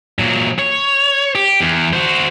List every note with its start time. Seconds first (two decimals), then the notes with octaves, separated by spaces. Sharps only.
0.19 A#2 F#3
0.59 C#5
1.35 G4
1.60 E2
1.93 F#4 C5